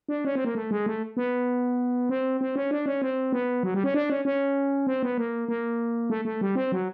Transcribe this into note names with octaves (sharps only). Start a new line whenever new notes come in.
D4
C#4
C4
A#3
A3
G#3
A3
B3
C4
C4
C#4
D4
C#4
C4
B3
F#3
G3
C#4
D4
C#4
C#4
C4
B3
A#3
A#3
A3
A3
G3
C4
F#3